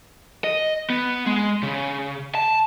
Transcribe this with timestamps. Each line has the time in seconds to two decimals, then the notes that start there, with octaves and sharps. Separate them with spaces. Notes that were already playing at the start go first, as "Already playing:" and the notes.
0.44 D#5
0.90 B3
1.26 G#3
1.63 C#3
2.35 A5